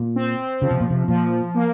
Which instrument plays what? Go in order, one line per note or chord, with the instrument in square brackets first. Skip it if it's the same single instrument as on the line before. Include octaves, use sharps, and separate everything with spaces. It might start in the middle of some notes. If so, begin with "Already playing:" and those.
Already playing: [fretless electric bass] A#2
[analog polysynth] C4
[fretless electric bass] C#3 [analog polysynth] F3
[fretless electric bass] C3
A#2
C3
[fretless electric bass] A#2 [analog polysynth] F3
[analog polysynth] A#3